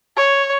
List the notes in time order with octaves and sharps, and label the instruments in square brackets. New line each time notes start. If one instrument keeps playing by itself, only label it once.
[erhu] C#5